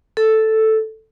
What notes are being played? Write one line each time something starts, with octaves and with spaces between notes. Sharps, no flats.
A4